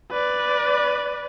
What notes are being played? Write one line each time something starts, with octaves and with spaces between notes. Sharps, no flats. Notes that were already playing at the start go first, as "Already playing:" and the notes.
B4 D5